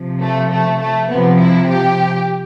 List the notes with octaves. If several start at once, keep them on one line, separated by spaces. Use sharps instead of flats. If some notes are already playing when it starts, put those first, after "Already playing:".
Already playing: C3 F3
A3
A3
A3
C3 F3 B3
E4
G4